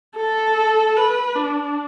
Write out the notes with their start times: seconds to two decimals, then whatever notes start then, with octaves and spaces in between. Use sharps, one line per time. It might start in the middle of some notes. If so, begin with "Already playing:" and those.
0.16 A4
0.97 B4
1.36 D4